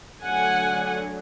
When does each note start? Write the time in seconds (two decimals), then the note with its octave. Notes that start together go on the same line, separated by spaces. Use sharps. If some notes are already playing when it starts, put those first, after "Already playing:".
0.25 D3 F#3 A3 D4 F#5 G#5